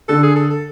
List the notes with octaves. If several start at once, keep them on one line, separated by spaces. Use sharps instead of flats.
D3 A4
G#4
A4
A4